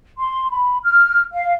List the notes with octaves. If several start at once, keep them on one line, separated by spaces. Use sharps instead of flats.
C6
B5
F6
F5